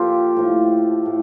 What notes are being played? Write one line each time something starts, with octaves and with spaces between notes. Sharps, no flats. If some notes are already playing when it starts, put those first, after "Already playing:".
Already playing: A#2 F3 F4 G4 A4
A2 F3
A2